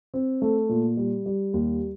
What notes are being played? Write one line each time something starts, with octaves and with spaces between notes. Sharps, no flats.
C4
A3
A#2
G3
G3
D#2